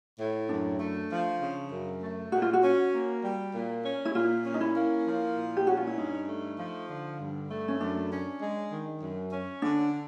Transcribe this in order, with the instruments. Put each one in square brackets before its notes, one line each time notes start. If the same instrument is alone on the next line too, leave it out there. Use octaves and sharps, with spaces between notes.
[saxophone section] A2
[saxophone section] F#2 [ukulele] D4
[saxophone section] A3
F3
C#3
F#2
A3
[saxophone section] A#2 [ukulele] F#4
[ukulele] F4
F#4
[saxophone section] C#4
A#3
G3
A#2
C#4
[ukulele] E4
[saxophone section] A#2 [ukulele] F4
[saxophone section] C#4
[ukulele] D#4
E4
[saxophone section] A#3
F3
A#2
[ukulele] G4
[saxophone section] C#4 [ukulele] F#4
[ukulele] F4
E4
[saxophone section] G2 [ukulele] D#4
[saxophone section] A3
F3
D3
G2
A3
[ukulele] C#4
[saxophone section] F#2 [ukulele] D4
[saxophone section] C#4
G#3
D#3
F#2
C#4
[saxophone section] D3 [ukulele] D4